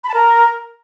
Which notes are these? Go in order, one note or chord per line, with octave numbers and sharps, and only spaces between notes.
B5
A5
A#4